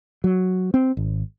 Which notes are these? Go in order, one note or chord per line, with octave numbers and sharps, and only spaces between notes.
F#3
C4
G#1